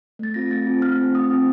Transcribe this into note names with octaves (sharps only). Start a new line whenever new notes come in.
A3 A6
C4 F4 A#6
A3 A6
C4 F4
A3 F6
C4 F4
A3 D#6
C4 F4